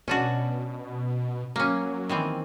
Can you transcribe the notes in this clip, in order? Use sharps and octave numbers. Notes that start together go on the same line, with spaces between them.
B2 C#4 D4 F#4
F#3 A#3 C#4
D#3 E3 C4